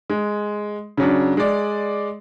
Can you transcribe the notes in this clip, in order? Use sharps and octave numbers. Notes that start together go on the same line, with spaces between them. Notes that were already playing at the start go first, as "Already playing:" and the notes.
G#3
C#3 F#3 D4
G#3 D5